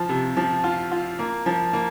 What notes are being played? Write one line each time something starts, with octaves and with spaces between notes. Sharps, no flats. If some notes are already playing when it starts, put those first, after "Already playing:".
Already playing: F3 F4
C3
F3
F4
F4
A#3
F3
A#3